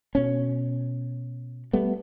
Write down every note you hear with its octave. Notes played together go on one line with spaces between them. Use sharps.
B2 C#4
G3 A3 B3